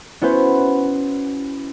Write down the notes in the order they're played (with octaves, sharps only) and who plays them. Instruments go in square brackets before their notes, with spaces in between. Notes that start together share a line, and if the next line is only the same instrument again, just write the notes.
[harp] B3 C#4 E4 F#4 B4 C5